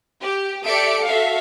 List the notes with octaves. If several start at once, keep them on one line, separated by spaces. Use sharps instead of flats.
G4
G4 A4 D5 E5 C#7 D7
F#4 A4 E5 F5